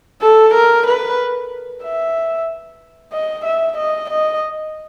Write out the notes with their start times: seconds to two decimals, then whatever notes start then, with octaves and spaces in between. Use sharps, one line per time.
0.22 A4
0.54 A#4
0.86 B4
1.83 E5
3.13 D#5
3.45 E5
3.77 D#5
4.10 D#5